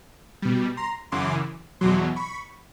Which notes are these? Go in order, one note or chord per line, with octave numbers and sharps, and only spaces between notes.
B2 G3
A#5 C6
F#2 C#3 E3 C6 D6
E2 B2 F#3 C6 D6
B5 C#6